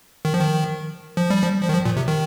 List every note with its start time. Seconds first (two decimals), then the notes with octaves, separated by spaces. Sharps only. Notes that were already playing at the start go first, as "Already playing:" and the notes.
0.25 D#3
0.34 F3
0.41 D#3
1.17 F3
1.30 G3
1.42 F3
1.63 F3
1.69 D#3
1.74 F3
1.85 A#2
1.97 C3
2.08 D#3